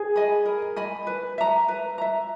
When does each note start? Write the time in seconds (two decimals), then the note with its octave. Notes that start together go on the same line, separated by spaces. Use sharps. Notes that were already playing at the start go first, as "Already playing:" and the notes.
Already playing: G#4
0.16 D#5 G#5 B5
0.46 A#4
0.76 D#5 G#5 B5
1.07 B4
1.38 E5 A#5
1.68 B4
1.98 E5 A#5